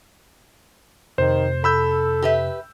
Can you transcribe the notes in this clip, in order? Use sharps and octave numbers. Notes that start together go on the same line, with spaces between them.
F2 C3 D#3 C5
A4 B5 E6 G6
G4 B4 E5